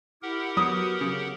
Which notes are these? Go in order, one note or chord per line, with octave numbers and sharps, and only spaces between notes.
E4 G4 A#4 F#5
F#3 B3 D#6
C#3